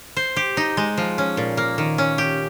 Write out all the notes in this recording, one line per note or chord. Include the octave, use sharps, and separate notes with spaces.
C5
G4
D#4
G#3
F3
C#4
A#2
A#3
D#3
C#4
G4